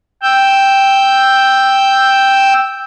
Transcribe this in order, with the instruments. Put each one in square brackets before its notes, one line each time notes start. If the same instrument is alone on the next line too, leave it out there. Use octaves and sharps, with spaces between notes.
[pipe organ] G5 E6 G6